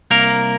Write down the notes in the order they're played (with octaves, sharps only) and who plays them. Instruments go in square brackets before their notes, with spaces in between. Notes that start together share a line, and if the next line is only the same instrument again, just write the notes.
[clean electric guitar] C2 A#3 A#4